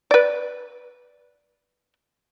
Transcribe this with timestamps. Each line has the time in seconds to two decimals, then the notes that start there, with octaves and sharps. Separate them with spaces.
0.11 B4 D5